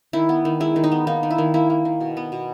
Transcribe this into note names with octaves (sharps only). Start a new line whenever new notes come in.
D#3 E4
B3
D#3
G#3 E4
D#3
D#4
B3
A#3 D#4
D#3
E4
D#3
A#3 E4
A#3
D#3
B2
B3
B2